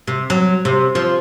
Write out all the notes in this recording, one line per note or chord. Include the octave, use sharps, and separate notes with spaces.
C3
F#3
C3
F3